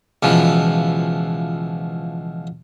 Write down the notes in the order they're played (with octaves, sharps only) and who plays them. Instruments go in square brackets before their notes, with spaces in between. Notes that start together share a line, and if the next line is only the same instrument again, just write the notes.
[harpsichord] C#2 B2 E3 F3